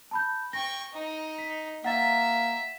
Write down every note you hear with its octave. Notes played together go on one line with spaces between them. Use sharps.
A5 B5 G6
G5 C#6 A#6
D#4
B6
A#3 E5 F#5 A6